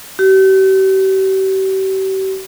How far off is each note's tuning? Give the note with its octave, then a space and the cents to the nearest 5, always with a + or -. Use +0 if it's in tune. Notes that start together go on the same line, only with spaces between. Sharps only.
G4 -40